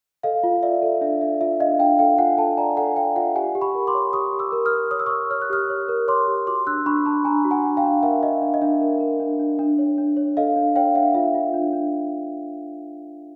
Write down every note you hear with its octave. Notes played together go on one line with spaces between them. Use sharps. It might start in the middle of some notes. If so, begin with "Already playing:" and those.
A4 D#5 F5
F4
D5 E5
A4
D4 E5
D5 E5
F4 E5
D4 D#5 F5
D4 F5 G5
A4 F5 G5
F4 F#5 G#5
A4 G5 A5
D5 G#5 A#5
A4 F#5 G#5
D5 F5 G5
F4 E5 F#5
G4 F#5 G#5
G4
B5 C#6
A#4
C6 D6
C#5
G4 C#6 D#6
G4
D6 E6
A#4
D#6 F6
A#4
C#5 D#6
E6
C#5 C#6 D#6
C#5 F6
F#6
G4 D#6 F6
C#5
A#4
C#5 C6 D6
G4
F#4 C6 D6
D4 E6 F#6
D4 B5 C#6
D4 A5 B5
D4 G#5 A#5
F#4
F#5 G#5
D4
F5 G5
D4
A#4 E5 F#5
F#4 D#5 F5
D4
D#5
D4 E5
A#4
A#4
D4
D4
D4
C#5
D4
C#5
A4 D#5 F5
D4
C#5 F5 G5
D4 E5 F#5
F4 E5
F4
D4
D4